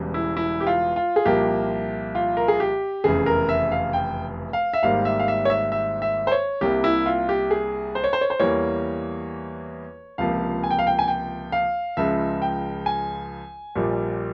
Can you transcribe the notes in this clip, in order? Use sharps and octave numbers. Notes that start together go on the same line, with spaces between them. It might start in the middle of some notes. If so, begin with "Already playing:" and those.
Already playing: E1 E2 C#3 G3
E4
E4
G4
F4
F4
G#4
C2 A#2 F3 A#3 G4
F4
A#4
G#4
G4
F1 E2 C#3 G#4
A#4
E5
F5
G5
F5
E5
G#1 G#2 G3 A#3 F5
E5
F5
E5
C#5
E5
E5
E5
C5
C#5
C2 C3 G3 A#3 G4
E4
F4
G4
G#4
C5
C#5
C5
C#5
C5
E2 E3 G3 A#3 C#5
C#2 C3 F3 A#3 F5
G#5
G5
F5
G5
G#5
G5
F5
C#2 C#3 F3 G#3 E5
G5
G#5
A#1 A#2 G3